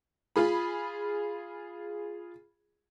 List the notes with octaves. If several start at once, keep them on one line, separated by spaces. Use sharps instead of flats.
F4 G#4 B5